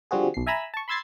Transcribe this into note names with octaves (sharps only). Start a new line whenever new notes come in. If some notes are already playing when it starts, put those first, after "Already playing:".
D3 F3 G3 C4 F#4 G#4
B1 C7
E5 G#5 A#5 B5 E6
A5 C#6
B5 C6 E6 G#6 A6 C7